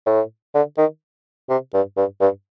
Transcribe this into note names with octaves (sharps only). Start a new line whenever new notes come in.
A2
D3
D#3
C3
G2
G2
G2